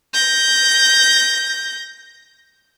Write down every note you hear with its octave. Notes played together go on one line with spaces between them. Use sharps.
G6 A#6